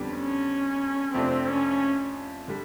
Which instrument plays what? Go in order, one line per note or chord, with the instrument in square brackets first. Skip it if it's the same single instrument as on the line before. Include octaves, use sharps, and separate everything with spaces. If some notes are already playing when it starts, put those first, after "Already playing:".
Already playing: [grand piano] F2 D3 G3 B3 D4
[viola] C#4
[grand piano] F2 C3 F3 A3 D4 [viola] C4
[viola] C#4
[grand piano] D3 G3